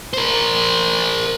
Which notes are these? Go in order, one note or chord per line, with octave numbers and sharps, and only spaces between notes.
A#4 C5